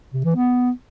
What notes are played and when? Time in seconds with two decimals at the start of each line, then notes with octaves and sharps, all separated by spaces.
0.14 C3
0.25 E3
0.36 B3